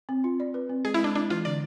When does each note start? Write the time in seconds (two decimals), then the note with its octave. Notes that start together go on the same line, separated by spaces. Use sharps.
0.09 C4
0.24 F4
0.40 D5
0.54 B4
0.69 C4
0.85 G#3 G#4
0.94 E4
0.99 G#3 D4
1.15 D4 E4
1.30 E3 F4
1.45 D3 D5